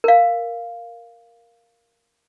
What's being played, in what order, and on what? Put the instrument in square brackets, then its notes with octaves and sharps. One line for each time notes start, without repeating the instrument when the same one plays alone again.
[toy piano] A#4 F5